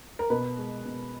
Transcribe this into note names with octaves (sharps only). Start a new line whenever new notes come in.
A#4
B2 B4
G#3
B2